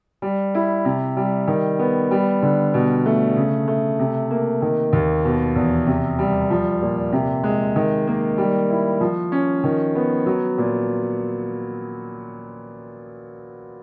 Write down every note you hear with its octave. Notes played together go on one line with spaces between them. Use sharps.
G3
E4
C3
G3
D#3
B3
G3
D3
B2
A3
C#3
A3
C3
A#3
D#3
D#2
B2
E2
C3
G3
F3
A#2
C3
G#3
D#3
A#3
G3
E4
F3
C#4
D#3
B3
F#3
A#2